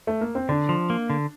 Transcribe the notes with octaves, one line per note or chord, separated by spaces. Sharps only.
A3
A#3
C4
D3 D4
F3
A#3
D3